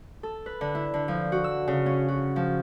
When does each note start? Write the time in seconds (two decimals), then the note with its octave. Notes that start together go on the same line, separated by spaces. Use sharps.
0.23 A4
0.46 B4
0.61 D3
0.75 E4
0.94 D3
1.08 F3
1.32 F#4
1.44 E6
1.68 C#3
1.86 C#4
2.08 F#4
2.36 F3